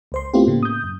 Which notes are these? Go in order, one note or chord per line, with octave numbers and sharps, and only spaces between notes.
C#2 C5 C6
A3 B3 C4 E4 F4 G4
A2 C#3 A#3
D#6 G6
F#2